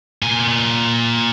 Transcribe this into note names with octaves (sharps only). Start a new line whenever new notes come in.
A#2 G#5